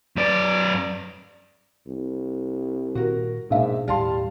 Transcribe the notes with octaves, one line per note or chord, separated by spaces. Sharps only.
F#2 D5
C2
A#2 D#3 F#4 A#4
A#1 G#2 B2 E5
D#2 A2 G3 C#4 F5 A5 C6